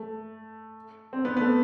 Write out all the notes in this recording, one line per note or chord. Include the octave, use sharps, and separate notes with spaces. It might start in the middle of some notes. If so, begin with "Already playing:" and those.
Already playing: A3
C4
B3
B3
A3